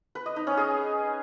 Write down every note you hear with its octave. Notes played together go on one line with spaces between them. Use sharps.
B4
D#5
D#4
C#4
G#4